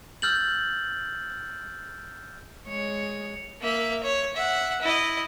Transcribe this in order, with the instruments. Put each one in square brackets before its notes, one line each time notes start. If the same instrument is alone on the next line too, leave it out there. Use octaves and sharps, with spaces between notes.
[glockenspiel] E6 F6 G6 A6 F#7
[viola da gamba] G#3 C#5
[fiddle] A#3 E5
C#5
E5 F#5
E4 D#5